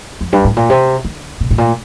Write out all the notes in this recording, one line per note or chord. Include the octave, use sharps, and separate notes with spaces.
F2
G2
A2
A#2
C3
D3
C3
A2
A#2